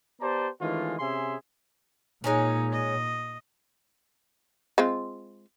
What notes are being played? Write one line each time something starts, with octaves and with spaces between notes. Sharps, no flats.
B3 G4 C5 D5 A5 A#5
D#3 E3 G#3 A3 C#4 F4
C3 C#4 G#4 E5 G#5 C6
A#2 G#3 C#4 D#4 G#5
D#5
G#3 C4 F4